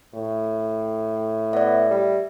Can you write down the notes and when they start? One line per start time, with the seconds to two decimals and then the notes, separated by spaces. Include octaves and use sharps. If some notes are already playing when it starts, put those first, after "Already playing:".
0.15 A2
1.53 B3 D5 E5
1.91 G3